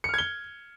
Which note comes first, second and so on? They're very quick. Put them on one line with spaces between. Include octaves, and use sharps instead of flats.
C#7 F6 G#6 G7